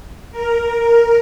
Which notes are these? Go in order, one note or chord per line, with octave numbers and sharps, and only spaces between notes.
A#4